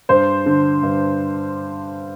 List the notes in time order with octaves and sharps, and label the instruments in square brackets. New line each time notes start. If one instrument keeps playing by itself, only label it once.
[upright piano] G2 C5
D3
G2